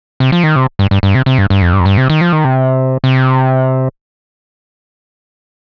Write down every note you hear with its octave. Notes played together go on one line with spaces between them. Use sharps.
C3
F3
D#3
C3
G2
G2
G2
C3
C3
G2
G2
F2
G2
F2
G2
C3
D#3
F3
D#3
C3
C3